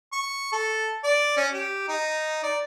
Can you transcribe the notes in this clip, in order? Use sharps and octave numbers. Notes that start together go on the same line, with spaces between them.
C#6
A4
D5
C#4
G4
D#4
D5